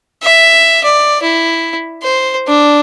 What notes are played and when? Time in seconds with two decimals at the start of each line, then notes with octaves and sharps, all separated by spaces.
0.23 E5
0.84 D5
1.23 E4
2.03 C5
2.48 D4